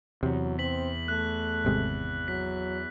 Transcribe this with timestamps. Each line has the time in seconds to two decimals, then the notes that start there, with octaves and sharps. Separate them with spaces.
0.23 E2 C3 F#3
0.59 C4 B6 F#7
1.08 A3 F#6
1.65 G#1 C3 G#3
2.28 F#3 B6